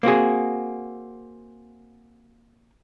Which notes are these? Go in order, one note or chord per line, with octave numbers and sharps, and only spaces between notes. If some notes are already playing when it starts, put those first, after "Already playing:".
A#3 C4 F#4 G#4